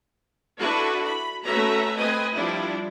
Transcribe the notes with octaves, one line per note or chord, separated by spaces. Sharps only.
D4 E4 F#4 A4 B4
B5
A3 C#4 F#4 B4 E5 A#5
C4 B4 D#5 G#5
F3 G3 D4 E4